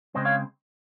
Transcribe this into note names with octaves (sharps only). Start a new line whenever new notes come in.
C#3 G#3 C4 C5 D#5
C#5 F5